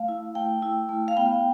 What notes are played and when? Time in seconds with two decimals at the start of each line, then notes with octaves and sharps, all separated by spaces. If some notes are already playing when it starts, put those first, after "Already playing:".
Already playing: A3 F5
0.08 E4
0.35 A3 G5
0.62 E4
0.89 A3
1.08 F5
1.17 B3 G5